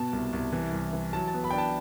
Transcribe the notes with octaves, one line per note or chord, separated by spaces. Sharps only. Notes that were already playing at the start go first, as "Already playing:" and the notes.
Already playing: B2 B3 A5
C2
C2
E3
C2
E3
F#3 A5
A5
B3
B5
D4 G5
A5